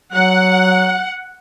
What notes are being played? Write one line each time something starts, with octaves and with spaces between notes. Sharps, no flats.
F#3 F#5